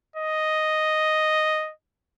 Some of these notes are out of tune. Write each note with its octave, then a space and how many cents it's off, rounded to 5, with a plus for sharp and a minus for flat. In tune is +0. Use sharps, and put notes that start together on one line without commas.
D#5 +0